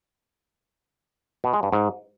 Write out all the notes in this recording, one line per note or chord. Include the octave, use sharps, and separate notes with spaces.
B2
G#3
G2
G#2